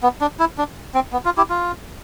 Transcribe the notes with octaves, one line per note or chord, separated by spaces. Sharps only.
B3
D4
E4
D4
C4
B3
F4
E4 G4
F4